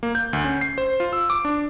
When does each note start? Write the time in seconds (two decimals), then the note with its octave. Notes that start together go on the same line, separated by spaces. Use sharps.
0.03 A#3
0.15 G6
0.33 D2
0.44 C#4
0.61 C7
0.78 C5
1.00 F4
1.13 E6
1.30 D6
1.45 D4